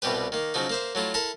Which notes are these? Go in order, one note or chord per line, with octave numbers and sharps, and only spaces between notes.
C2 B2 G3 G4 B4
D#3 A#3
C#3 F3 F#3 D#4
A#3 C5 E5
F#3 A3 E4 F4
E4 A4 A#4 E5